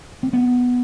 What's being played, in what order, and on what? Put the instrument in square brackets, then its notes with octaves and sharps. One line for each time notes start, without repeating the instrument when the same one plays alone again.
[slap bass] C4
B3